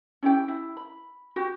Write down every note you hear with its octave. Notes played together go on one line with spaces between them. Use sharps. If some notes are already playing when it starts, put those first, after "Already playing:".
C#4 E4 G4 G5
E4
B5
F#4 G4